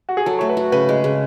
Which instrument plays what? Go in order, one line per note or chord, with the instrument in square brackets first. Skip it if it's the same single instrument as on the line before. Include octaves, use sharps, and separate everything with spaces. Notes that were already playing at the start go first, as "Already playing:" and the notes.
[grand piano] F#4
G#4
[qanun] F#3 [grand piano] A4
[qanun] A3 [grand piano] C#5
[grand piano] B4
[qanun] F#4
[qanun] C#3 [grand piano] B4
[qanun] G#3
C#3